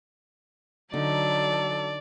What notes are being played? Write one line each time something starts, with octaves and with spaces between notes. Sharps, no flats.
D3 F#3 D#4 A4 D5